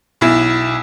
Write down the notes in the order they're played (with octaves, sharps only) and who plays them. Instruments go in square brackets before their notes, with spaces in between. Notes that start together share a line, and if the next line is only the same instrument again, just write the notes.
[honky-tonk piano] B1 E4